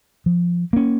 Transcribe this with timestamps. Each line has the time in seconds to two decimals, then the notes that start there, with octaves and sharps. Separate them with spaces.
0.26 F3
0.73 A#3 C#4